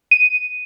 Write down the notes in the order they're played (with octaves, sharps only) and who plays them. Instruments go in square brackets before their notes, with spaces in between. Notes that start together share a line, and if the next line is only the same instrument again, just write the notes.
[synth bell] D#7